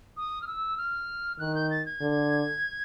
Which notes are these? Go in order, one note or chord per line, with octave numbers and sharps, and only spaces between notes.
D#6
F6
E6
F6
D#3 F#6
G6
A6
G#6
D3